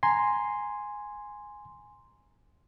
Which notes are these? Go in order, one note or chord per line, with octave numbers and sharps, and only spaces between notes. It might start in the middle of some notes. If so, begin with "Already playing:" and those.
G#5 A#5 C6